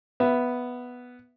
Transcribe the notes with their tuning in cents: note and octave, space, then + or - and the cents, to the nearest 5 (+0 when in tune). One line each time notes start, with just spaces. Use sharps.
B3 +0 E5 +15